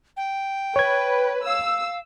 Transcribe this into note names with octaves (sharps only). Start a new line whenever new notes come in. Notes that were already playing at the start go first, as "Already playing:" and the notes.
G5
B4 C#5 G#6
F5 E6